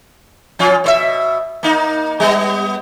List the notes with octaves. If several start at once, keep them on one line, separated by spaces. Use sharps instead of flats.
F3 C#4 F4
B2 C5 E5
A#3 D#4
G3 B3